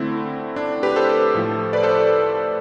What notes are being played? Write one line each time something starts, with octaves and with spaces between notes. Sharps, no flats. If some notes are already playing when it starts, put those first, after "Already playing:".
Already playing: D3 A3 C4 E4
D4
G4 B4
A4 C5
A2 F3 A3
B4 D5
A4 C5